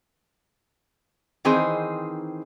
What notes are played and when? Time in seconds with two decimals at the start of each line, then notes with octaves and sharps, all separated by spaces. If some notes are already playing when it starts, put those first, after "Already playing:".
1.45 D#3 E3 C4 D#4 G#4 C5